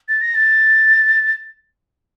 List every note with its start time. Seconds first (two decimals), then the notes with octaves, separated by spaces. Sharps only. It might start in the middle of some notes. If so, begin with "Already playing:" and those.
0.09 A6
0.21 A#6
0.35 A6